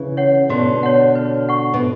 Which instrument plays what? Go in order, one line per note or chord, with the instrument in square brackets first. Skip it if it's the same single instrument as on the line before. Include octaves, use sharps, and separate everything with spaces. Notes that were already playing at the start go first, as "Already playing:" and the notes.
Already playing: [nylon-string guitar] C#3 E3
[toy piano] C#5 F#5
[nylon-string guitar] B2 D3 [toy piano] F#4
[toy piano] C#5 F#5
B4
F#5 C#6
[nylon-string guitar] B2